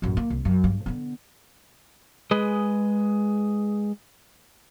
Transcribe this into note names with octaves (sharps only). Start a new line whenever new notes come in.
A1 F#2
A#3
C2
F#2
G2
D3 B3
G#3 G#4 B4 D#5